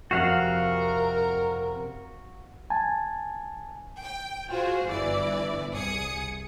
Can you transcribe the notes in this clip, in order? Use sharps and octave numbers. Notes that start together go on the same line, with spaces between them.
F2 C3 F#4 A#4 F5 F#5
G#5 A5
G5
F4 F#4 G#4 C5
G1 E3 D5
C2 G#4 D#6 C#7